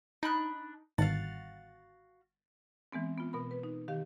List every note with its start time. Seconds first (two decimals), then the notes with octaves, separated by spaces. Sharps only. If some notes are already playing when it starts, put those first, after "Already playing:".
0.23 D4 D#4 B5 F#6
0.98 G1 G#2 D#3 F#4 F5 A6
2.92 E3 G#3 B3 C4
3.18 B3 F4
3.33 B2 A#4 B5
3.51 B4
3.63 D#4
3.88 D#3 G4 F5